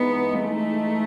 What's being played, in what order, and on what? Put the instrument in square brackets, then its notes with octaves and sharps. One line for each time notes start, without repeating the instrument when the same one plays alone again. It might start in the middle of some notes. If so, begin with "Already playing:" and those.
Already playing: [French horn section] E3 G#3 D#4 [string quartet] B3
[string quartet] A3